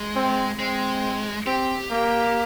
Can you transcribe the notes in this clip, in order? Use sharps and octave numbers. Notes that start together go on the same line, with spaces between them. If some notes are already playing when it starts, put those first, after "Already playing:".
Already playing: G#3
C4
G#3 C4
C4 G4
A#3